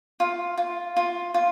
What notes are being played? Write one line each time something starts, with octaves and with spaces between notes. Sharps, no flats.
F4
F4
F4
F4